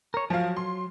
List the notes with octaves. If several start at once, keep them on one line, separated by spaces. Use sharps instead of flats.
A#4 C#5
F3 F#3 F5
C6